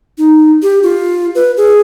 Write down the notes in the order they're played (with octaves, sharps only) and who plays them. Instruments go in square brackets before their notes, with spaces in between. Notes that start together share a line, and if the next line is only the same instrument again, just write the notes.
[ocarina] D#4
G4
F4
B4
G#4